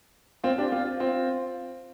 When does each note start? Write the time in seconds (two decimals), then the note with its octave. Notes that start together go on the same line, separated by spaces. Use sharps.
0.44 C4 F4
0.58 D4 G4
0.72 C4 F4
1.00 C4 F4